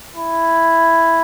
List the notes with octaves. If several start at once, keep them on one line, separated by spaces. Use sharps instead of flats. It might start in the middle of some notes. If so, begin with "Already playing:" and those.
E4